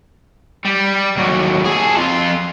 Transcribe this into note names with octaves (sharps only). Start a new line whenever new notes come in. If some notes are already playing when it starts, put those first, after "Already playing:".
G3
D#2 F#3
G#4 A4
F2 F4